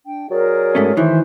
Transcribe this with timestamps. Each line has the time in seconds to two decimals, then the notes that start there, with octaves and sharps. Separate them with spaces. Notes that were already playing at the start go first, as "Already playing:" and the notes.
0.05 D4 G5
0.31 F#3 G#4 A#4 D5
0.75 G#2 A3 C#4
0.97 D#3 E3 C5 E5 G#5